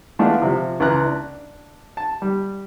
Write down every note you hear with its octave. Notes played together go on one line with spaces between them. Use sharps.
E3 G#3 A3 B3 D4 F4
C3 F3
C#2 E3 B4 A#5 F#6
D4
A5
G3